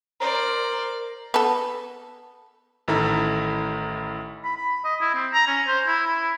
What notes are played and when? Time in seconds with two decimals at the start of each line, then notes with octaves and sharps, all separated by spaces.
0.20 A#4 C5 D5
1.34 B3 A4
2.88 A1 D#3 E4 A4 A#5 B5
4.44 B5
4.57 B5
4.85 D#5
5.01 E4
5.15 C4
5.33 A#5
5.47 C#4
5.67 C5
5.87 E4
6.07 E4